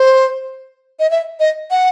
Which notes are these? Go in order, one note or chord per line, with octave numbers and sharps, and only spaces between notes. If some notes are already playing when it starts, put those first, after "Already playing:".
Already playing: C5
D#5
E5
D#5
F#5